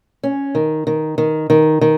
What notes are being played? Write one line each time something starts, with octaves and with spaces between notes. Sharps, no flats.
C#4
D#3
D#3
D#3
D#3
D#3